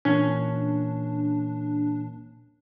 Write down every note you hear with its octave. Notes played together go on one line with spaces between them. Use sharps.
A#2 E3 A#3 C#4 D4